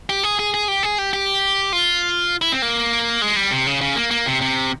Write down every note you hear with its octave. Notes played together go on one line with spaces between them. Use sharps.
G4
G#4
G#4
G#4
G4
G#4
G4
G4
F4
E4
C4
A#3
G#3
G3
C3
C#3
C#3
A#3
A#3
C3
C3